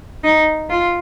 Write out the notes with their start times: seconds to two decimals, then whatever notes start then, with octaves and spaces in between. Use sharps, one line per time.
0.24 D#4
0.70 F4